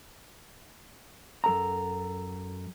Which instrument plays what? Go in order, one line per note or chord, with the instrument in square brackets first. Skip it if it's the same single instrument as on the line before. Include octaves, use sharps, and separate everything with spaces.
[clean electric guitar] F#2 A4 A#5